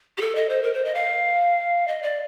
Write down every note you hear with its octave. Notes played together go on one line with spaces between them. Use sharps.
G4
A4
D#5
C5
A#4
C5
D#5
F5
D#5
D5